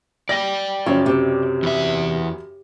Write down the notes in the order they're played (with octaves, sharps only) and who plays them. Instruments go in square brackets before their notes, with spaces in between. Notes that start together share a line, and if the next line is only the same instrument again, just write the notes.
[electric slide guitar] D5 G5 [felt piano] A#6
[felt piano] F#2 C#3 C#5 [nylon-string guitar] F3
[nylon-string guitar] C3
[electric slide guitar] E2 E5